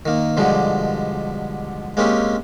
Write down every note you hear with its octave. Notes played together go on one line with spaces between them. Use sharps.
D#3 A#3
B2 D3 F3 G3 G#3
G#3 A#3 C4 C#4 G4